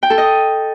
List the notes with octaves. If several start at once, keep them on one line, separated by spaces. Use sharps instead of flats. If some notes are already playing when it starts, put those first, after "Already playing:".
G5
A4
D#5